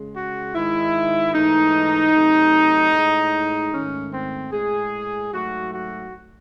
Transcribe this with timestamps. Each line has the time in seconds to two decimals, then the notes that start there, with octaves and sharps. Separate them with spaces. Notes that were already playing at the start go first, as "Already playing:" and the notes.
Already playing: C#3 G#3
0.14 F#4
0.54 G#2 D#3 G#3 E4
1.33 G#2 E3 A3 D#4
2.13 C3 F#3 A3
2.93 A2 G#3
3.72 G#2 D#3 A3 C#4
4.13 C4
4.52 A2 G#3 G#4
5.32 G#2 F#3 A3 F#4
5.72 F#4